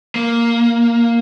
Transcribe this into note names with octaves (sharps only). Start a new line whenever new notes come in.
A#3